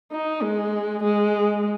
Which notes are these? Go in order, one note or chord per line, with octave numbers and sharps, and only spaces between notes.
D#4
G#3
G#3